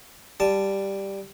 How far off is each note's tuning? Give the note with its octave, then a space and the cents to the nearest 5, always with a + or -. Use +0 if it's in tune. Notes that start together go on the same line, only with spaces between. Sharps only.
G3 +0 A5 +0